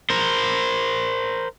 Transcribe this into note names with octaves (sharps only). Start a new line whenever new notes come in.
A#4 C5